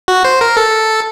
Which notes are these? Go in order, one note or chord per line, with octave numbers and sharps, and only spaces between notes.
F#4
C5
A#4
A4